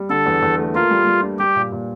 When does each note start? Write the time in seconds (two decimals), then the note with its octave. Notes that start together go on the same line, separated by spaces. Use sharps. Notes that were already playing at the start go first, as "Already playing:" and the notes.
Already playing: G3
0.09 D3 A4
0.26 E2
0.42 E2
0.58 A3
0.74 A#3 F4
0.91 G3
1.06 G3
1.23 D4
1.39 G3 G4
1.55 A#2
1.72 A#2